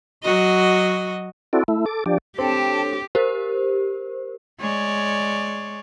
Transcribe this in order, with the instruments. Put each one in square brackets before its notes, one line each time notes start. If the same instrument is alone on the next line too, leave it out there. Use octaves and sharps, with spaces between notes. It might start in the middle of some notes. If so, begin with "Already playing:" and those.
[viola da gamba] F#3 F#4 D#5
[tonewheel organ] C4 E4 F#4 A4 D5
A3 E4
A4 D6
F3 D4 G4 D5
[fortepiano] C4 [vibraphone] D4 A4 C#5 [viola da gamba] G4 [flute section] G5 A5
[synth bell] G4 A#4 C5
[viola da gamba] G#3 C#5 D5